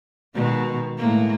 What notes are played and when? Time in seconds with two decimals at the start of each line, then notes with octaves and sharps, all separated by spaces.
0.35 B2 D#3 G#3
0.98 A2 G#3 A#3